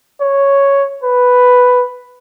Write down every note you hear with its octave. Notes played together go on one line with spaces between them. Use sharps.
C#5
B4